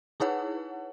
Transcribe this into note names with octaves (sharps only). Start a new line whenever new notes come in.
D#4 E4 G#4 B4 C#5 F#5